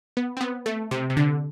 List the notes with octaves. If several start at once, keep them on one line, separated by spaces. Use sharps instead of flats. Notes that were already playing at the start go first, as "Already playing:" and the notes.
B3
C4
B3
A3
C3
C3
D3